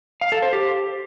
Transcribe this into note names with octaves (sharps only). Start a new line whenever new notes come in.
F5
A4
C5
G4